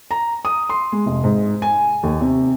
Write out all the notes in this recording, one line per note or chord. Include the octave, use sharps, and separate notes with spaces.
A#5
D#6
C6
G#3
F1
G#2
G#5
D#2
C3